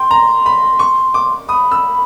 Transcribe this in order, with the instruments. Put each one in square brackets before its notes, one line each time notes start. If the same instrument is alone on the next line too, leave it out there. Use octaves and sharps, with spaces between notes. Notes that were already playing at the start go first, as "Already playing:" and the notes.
Already playing: [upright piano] G5 [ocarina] C6
[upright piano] A#5
B5
C#6
D6
[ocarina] B5 [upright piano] D#6
[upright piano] E6